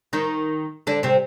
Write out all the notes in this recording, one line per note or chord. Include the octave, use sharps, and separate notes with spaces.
D#3 D#4
D3 D4
C3 C4